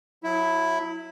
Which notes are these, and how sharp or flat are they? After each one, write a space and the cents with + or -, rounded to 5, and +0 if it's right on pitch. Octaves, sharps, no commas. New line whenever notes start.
F#3 -20 E4 +0